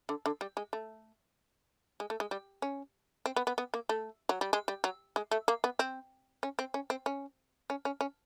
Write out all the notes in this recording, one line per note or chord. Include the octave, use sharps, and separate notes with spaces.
D3
D3
G3
G#3
A3
G#3
A3
G#3
G3
C#4
C4
B3
B3
B3
A#3
A3
F#3
G3
G#3
G3
F#3
G#3
A3
A#3
B3
C4
C#4
C4
C#4
C4
C#4
C#4
C#4
C#4